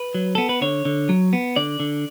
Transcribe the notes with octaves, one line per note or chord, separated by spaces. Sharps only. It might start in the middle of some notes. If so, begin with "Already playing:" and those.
Already playing: B4
F#3
B3 A4
B4
D3 C#5
D3
F#3
B3
D3 D5
D3